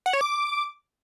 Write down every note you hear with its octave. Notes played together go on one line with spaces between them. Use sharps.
F#5
C#5
D6